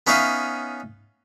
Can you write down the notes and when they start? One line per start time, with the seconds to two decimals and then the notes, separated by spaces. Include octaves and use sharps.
0.07 B3 C#4 D#4 C#5 E5 F5